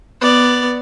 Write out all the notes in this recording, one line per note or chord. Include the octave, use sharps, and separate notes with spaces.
B3 D5